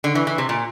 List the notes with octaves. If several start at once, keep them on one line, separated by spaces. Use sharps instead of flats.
D3
E3
E3
C3
A#2